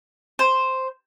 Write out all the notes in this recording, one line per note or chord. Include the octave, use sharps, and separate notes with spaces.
C5